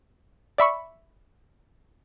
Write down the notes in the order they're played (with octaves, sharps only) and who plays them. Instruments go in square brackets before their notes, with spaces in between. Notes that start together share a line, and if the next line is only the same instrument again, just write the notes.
[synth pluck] D5 E5 B5 C#6